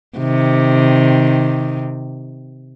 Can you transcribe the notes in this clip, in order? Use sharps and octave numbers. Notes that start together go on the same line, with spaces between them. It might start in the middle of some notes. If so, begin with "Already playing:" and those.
C3 D#3